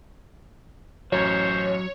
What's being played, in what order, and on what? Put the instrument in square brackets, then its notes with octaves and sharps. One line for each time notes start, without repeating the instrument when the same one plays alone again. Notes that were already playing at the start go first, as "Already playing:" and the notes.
[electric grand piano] A1 F#2 C#4 [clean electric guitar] F#3 [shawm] C5 [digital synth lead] C#5